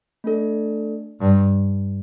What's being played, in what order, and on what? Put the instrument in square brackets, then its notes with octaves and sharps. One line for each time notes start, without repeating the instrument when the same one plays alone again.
[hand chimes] A3 D4 A4 D5
[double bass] G2